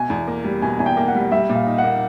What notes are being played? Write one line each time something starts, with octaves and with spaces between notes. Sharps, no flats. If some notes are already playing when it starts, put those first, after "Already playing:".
Already playing: B2 G#5
E2
A#3
G3
B2 G#5
E2 G#5
G5
A#3
F#5
G3
G3 E5
A#2
F5
D#4
F#5
A#3